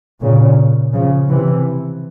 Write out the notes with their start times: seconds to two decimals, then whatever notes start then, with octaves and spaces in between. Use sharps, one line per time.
0.21 A#2 C#3
0.93 C#3 F3
1.28 C3 E3